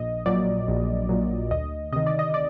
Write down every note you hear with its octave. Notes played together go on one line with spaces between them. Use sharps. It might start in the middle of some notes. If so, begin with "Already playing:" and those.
Already playing: A#1 D#5
A#2 F#3 D5
A#1
A#2 F#3
D2 D#5
C3 D#3 D#5
D5
D#5
D5